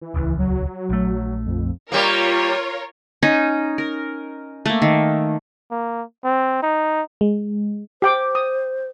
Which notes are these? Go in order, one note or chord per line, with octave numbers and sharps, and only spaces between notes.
E3
D#1 C#2
F#3
A#1 A3
F2
G3 A#3 F4 A#4 C#5
C#4 D#4
A#4
A3 A#3
D#3
A#3
C4
D#4
G#3
G4 C5 G5 D6
D#6